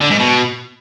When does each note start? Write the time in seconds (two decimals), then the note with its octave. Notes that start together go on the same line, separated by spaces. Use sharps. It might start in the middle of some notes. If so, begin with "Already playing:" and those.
0.01 D3
0.10 G#2
0.20 B2